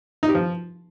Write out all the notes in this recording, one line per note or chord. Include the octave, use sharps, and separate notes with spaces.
D#4
G4
F3